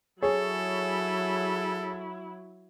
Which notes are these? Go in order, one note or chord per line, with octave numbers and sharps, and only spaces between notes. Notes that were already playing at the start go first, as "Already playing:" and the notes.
F#3 E4 G#4 A4 C#5